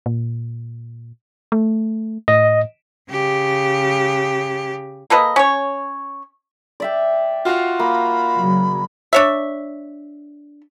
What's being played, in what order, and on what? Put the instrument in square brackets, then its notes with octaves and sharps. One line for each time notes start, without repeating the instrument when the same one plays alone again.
[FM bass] A#2
A3
[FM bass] A2 [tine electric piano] D#5
[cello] C#3 G4
[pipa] A#3 A4 B4 D#5
C#4 C#5
[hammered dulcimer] D5 E5 G5
[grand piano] F4 F#4 F5
[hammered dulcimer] A#3 [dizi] B5
[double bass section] C#3 F#3
[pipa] D4 C#5 E5